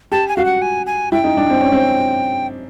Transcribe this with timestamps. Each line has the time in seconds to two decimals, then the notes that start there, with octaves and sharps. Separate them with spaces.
0.12 G4 A5
0.29 G#5
0.37 F#4 F5
0.45 F#5
0.62 G#5
0.86 G#5
1.12 E4 G5
1.24 D#4
1.37 D4
1.50 C4
1.61 C#4
1.72 C4